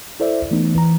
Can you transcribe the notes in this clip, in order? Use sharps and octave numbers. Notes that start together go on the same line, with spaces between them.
E4 A4 C5 D5 E5
E3 A3 B3 D#4
E3 A#5